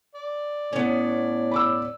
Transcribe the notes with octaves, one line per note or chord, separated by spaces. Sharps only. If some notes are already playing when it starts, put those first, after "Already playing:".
D5
A2 B3 C#4
B5 D6 E6